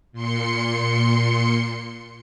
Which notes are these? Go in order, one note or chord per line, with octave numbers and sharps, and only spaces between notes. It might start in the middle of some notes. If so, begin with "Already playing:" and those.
A#2 C6 C#7